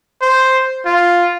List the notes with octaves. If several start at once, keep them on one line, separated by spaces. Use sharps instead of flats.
C5
F4